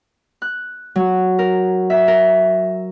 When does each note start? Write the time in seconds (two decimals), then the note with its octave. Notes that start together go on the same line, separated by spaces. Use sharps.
0.42 F#6
0.96 F#3
1.39 A#4
1.90 E5
2.08 A#4